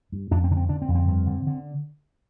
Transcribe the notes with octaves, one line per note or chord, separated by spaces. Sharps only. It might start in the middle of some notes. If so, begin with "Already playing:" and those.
G2
F2 D4
C4
D3 D4
C4
D3 D4
C4
F2
C4
G2
D3
D3